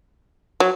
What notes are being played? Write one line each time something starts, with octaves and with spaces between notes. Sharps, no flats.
F#3